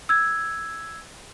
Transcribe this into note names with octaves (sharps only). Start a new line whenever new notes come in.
E6 G#6